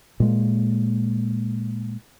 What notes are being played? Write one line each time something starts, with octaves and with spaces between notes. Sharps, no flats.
A#2 G#3 A#3